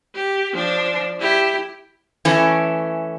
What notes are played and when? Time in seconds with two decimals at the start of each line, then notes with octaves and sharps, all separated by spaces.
0.15 G4
0.54 F3 D4
1.20 E4 G4
2.25 E3 A3 C#4 A4